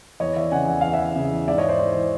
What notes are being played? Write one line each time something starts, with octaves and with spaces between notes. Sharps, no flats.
E2 C#5 D#5
E3 D5 E5
C#3 F#5 G#5
E2 F#5
E2 F5
E5 F#5
E3
C#3
E2
G#2 D5 E5
C#5 D#5
G#2
C5 D5
E3 C5
E3 C#5